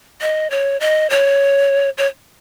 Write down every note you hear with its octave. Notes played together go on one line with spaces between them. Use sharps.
D#5
C#5
D#5
C#5
C#5